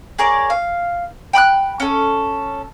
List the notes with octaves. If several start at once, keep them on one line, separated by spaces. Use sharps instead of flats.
G#4 A#4 C#5 D5
F5
G5 B5 D#6 F#6
C#4 A4